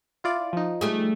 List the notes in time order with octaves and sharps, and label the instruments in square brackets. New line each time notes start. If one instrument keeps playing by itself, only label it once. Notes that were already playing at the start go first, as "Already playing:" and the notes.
[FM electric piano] E4 F4 D5
F3 D#4
[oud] G3 A3 G#4